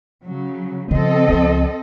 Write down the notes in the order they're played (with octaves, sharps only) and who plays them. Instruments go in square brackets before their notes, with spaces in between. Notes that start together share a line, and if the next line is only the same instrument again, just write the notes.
[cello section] C#3 F#3
[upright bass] C#3 F3 [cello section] C4 A4 D#5
[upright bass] C#2 F3